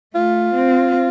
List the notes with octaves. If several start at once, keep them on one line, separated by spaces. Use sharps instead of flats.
A3 F4
C4